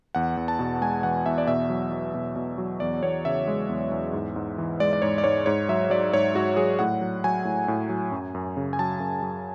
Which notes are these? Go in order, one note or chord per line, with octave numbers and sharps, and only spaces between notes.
E2 F#5
E2
A5
B2
G#3 G#5
E2 F#5
E2 E5
D5
B2 E5
F#3
F#3
B2
B2
F#3
E2 D5
E2 C#5
C#3 E5
G#3
E2
E2
G#2
G#2
E3
G#3 D5
D5
G#2 C#5
D5
G#2 C#5
G#2 C#5
F#3 E5
F#3 D5
G#2 C#5
G#2 F#4
F#3 G#4
A2 F#5
F#3
F#3 G#5
A2
A2
F#3
F#2
F#2
C#3
G#5
F#3 A5
F#2
F#2